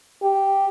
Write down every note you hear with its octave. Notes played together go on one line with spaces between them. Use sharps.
G4